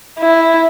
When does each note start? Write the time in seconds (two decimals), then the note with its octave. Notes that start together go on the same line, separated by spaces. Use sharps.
0.19 E4